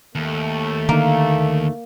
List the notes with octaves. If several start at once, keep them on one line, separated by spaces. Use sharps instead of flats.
D#2 A3
D3 D#3 A#3